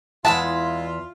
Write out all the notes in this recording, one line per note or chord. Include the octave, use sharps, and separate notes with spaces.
E2 G#2 G#3 E4 F4 E5 F#5 A5